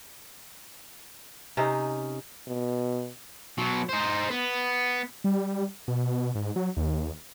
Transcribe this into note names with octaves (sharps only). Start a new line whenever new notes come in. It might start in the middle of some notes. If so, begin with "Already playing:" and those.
C3 C#4 D#4 C5
B2
B2 F#3
D#4 C5
B3
G3
B2
G#2
F#3
D#2